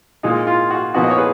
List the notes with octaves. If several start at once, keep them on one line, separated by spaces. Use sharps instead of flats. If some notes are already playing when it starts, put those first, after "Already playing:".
A#2 G#3 D#4
F4
F#4
A#2 F3 B3 D#4 F#4
D#5
C#5
G#4 B4